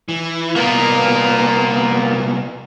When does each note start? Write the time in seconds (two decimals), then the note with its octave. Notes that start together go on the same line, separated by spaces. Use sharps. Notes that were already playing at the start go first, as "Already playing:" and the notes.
0.09 E3
0.56 C2 A#3 B3 F4 A#4